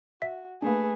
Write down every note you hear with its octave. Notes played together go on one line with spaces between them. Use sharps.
F#4 E5 B6
A3 A#3 D4 G#4 B4